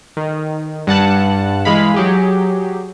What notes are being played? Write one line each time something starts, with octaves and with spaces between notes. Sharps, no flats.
D#3
G2 F#5 A5 F#6
E3 G#3 F5 B5
F#3 G4 G#4